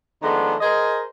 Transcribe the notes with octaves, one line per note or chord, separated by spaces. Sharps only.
D#3 F3 G#3 A3 B3 D4
G#4 A#4 C5 D#5